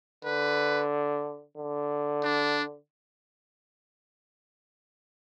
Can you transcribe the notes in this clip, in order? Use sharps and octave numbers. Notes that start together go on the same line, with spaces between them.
D3 B4
D3
D4